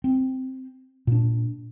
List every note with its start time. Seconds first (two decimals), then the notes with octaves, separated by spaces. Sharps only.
0.04 C4
1.07 A#2 D4